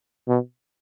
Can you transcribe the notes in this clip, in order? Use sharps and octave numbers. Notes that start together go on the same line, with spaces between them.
B2